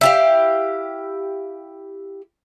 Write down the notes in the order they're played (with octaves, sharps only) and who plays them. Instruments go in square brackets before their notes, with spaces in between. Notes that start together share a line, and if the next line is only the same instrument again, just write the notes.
[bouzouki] E4 G4 F5